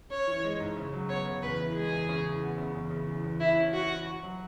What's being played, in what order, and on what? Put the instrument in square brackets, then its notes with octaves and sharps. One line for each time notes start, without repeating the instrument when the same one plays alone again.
[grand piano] C#4 [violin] C#5
[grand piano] E3
G#3
G#2
C#3
F#3
[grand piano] B3 [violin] C#5
[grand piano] C#3
[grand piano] E2 [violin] B4
[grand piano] E3
[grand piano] G#3 [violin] G#4
[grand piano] E2
C#3
E3
B3
C#3
E2
C#3
E3
E2
[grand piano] E3 [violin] E4
[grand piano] C#4
[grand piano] E4 [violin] F#4
[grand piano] E3
F#4
F#3